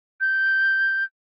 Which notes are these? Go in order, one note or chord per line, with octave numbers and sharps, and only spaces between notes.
G6